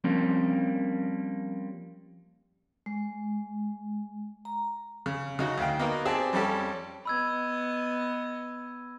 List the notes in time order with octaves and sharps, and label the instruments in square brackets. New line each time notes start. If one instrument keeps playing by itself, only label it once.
[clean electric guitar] F3 G3 A#3 C4 C#4
[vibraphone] G#3
A#5
[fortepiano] C#3
C#3 D#4 F#4
D2 F5 G5
A#3 B3 D#4 F#4
C4 G4 G#4 D5 A5
F2 G3 C#4 G4 A4
[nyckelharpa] B3 D#5 [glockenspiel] B5 E6 G#6